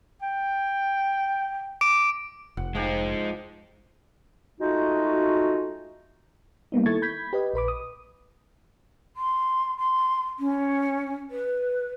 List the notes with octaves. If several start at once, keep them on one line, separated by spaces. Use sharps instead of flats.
G5
D6 D7
F1 F#5
F3 G#3 D#4 G4
G#3 A3 D#4 F4 F#4
G3 A#3 B3 D#4
D#3 E4 A4 C#6 G#6 A6
B5 G6 G#6 B6
G4 B4 D#5
A#1 B4 B5 D6
D#6
C6
C6
C#4
B4